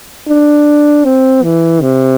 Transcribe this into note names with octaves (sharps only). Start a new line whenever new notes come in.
D4
C4
E3
C3